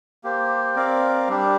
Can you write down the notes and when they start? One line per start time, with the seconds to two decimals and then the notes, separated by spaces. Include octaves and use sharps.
0.24 A#3 G4 C5
0.75 C4 A#4 D5 F5
1.28 G3 D4 G4